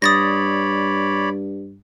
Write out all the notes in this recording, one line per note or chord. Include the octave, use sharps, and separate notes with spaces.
G2 C#5 D5 B5 D#6 A6 A#6